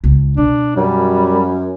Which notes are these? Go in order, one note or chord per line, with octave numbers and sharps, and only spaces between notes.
C#2
B2 D4
F#2 G3